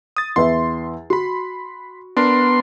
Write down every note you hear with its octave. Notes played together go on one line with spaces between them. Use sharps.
D#6 A6
E2 B4 E5 C6
F#4 B5 C6
B3 D4 A#4 C6